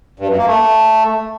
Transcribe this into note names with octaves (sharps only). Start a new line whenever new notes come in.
G2
F#2
A#3
A3